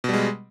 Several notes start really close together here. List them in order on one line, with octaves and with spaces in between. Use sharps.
B2 G3 G#3